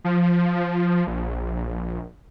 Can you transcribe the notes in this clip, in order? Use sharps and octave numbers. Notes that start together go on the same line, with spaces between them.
F3
A#1